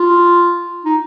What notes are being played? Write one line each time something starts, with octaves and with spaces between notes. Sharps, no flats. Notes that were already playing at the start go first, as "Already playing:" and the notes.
Already playing: F4
D#4